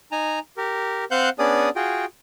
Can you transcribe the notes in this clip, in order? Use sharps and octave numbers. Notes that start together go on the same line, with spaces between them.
D#4 G#5 A#5
G4 A#4
C4 C5 F5 F#5 F#6 G6
B3 C#4 D4 G#4 D5 D#6
F4 F#4 G#4 G5